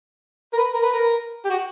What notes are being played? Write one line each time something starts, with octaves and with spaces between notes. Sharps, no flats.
A#4
B4
A#4
B4
A#4
G4
F#4